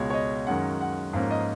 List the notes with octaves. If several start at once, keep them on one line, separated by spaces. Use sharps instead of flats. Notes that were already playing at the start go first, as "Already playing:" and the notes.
Already playing: C#2 B2 G#3 C#5
C#5
D#5
F#2 D#3 G#3 C#4 F#5
F#5
G#2 F3 A#3 C#4 F5
D#5